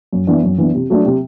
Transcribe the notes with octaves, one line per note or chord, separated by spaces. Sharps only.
F#2
E3 B3 D4
F#2
E3 B3 D4
C3
F#3 A3 D4
C3